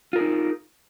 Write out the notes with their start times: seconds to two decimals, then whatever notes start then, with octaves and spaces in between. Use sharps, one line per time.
0.13 F4
0.16 A#4
0.18 G#4
0.21 D#4